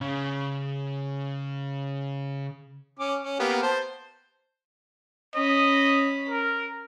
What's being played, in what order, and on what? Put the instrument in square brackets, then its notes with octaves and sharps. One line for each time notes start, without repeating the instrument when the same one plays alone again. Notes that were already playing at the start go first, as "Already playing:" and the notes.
[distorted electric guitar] C#3 C#4
[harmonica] C#4 D6
C#4
A#3 B3 G4
C5 A5
[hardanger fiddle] C#4 B5 [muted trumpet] D#5
[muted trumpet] A#4